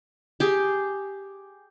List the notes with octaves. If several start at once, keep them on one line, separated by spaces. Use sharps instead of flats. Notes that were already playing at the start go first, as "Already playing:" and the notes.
G4 G#4